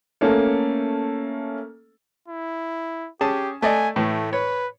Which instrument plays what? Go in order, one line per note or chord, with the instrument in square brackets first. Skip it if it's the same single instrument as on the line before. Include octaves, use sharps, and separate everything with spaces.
[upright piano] A3 A#3 C#4 A4
[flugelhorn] E4
[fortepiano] C#4 G#4 A5 [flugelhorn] G4
[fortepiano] A3 D5 D#5 [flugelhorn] G#5
[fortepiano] A2 E3 [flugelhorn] A3
[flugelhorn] B4 [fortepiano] C#5